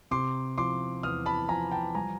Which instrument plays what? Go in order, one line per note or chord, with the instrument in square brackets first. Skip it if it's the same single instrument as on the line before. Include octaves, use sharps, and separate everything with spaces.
[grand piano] C3 C6 D6
F3 C6 D6
E2 D#6 F6
A5 B5
F3 G#5 A#5
G5 A5
G3 G#5 A#5